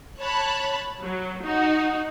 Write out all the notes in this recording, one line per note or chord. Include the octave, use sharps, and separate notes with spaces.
C#5 A5 B5 F#6
F#3
D#4 F#4